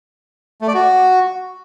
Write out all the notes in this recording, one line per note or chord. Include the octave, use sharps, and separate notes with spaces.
A3
D5
F#4